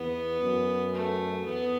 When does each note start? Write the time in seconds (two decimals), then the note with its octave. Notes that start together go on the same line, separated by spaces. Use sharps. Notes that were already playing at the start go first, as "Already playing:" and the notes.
Already playing: E2 B3
0.42 F#2
0.94 A3
1.45 E2 B3